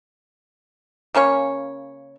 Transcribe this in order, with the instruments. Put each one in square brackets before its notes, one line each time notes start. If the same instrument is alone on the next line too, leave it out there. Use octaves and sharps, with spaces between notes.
[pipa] C#3 A#3 C#4 C#5